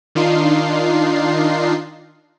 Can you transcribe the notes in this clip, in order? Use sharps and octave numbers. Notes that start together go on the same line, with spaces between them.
D#3 D4 D#4 F4 C7